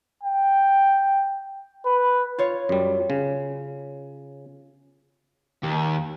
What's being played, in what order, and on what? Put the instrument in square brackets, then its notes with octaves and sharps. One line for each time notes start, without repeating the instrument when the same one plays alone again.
[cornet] G5
B4
[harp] F4 C#5
[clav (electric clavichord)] F#2 G3
C#3
[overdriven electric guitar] D#2